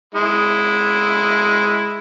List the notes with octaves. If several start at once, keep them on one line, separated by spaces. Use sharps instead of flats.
G#3 E4